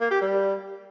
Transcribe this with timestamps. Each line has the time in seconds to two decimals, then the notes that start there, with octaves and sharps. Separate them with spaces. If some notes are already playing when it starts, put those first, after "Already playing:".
0.01 A#3
0.11 G4
0.21 G3